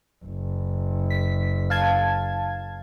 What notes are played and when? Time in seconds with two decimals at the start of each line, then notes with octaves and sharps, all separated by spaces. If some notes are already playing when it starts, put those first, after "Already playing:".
0.24 F#1
1.10 B6
1.70 F5 A5 G#6